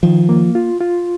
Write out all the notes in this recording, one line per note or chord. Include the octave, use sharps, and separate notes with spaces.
D#3 F3
A#3
F4
F4